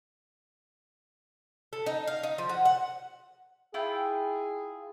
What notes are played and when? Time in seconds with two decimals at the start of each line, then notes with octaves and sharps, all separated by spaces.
1.73 A4
1.86 D#4
2.07 F5
2.23 D#4
2.38 F3
2.49 F#4
2.65 F#5
3.74 E4 F4 G#4 G5